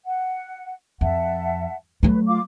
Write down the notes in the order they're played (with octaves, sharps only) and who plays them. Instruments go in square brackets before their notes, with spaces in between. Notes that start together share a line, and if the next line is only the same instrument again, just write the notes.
[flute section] F#5
[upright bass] F2 [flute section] E5 F#5 A5
[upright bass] F#3 A3 [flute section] B4
[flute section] F4 F5 D6